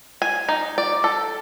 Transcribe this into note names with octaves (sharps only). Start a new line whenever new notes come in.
G#5
D#4
D5
A4